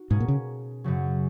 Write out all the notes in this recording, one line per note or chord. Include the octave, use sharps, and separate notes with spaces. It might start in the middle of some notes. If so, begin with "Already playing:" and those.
Already playing: D#4 F#4
G#2 B2 A#3 C#4 G#4
A#2
C#3
F#2 C#3 F#3